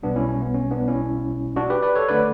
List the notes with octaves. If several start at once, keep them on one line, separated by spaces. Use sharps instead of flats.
B1 B2 G3 B3 D4
C#4 E4
C#4
B3
C#4
B3 D4
C#4 E4
D4 F#4
G4 B4
B4 D5
A4 C#5
D3 A3 B4 D5